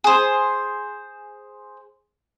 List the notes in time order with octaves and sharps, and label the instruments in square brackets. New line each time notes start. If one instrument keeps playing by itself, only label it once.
[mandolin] G#4 C5